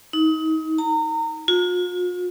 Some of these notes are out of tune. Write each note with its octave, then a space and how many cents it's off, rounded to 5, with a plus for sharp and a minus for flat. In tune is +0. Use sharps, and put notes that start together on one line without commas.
D#4 +30
A#5 -30
F4 +45